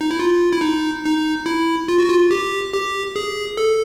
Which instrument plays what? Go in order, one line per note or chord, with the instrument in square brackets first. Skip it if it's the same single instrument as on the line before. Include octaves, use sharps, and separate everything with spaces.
[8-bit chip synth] D#4
E4
F4
E4
D#4
D#4
E4
F4
F#4
F4
G4
G4
G#4
A4